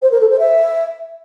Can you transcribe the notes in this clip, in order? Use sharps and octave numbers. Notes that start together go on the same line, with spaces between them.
C5
A#4
A4
C5
E5